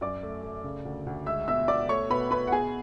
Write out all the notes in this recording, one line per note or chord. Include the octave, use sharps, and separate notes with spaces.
F#2 D5 D6
A3
A3
C#3
D2
D2
G#3 E5 E6
B2 E5 E6
B2 D5 D6
A3 C#5 C#6
B2 B4 B5
B2 B4 B5
F#5
B2 G#4 G#5